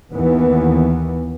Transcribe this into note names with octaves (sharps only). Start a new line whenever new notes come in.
D#2 E3 B3